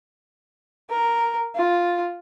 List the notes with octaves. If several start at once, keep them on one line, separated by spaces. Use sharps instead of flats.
A#4
F4